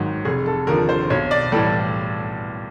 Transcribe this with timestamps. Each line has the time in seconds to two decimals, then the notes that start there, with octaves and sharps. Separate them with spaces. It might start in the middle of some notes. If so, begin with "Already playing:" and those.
Already playing: G#1 G#2 D#3 F#3
0.25 F1 G#4
0.46 A4
0.67 D#2 D3 F3 A#4
0.89 C5
1.10 B1 C#5
1.31 D5
1.52 A2 E3 G3 A4